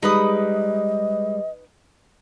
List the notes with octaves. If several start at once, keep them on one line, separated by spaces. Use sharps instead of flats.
G3 G#3 D#4 B4 D#5 D#6